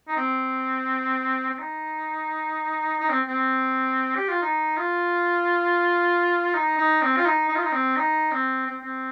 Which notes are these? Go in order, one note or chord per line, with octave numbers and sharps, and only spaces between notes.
D#4
C4
C4
D#4
D#4
C4
C4
G4
F4
D#4
F4
D#4
D#4
C4
F4
D#4
D#4
F4
D#4
C4
D#4
C4
C4
C4